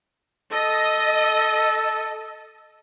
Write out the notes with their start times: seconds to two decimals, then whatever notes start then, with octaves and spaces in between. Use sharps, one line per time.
0.52 A4 D#5